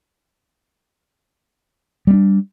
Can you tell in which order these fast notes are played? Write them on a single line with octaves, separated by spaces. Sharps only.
G3 B3 D4